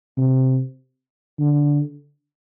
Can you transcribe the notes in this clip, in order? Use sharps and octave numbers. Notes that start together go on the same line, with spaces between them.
C3
D3